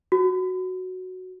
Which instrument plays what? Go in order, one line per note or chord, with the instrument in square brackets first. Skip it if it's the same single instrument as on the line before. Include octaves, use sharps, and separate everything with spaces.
[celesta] F#4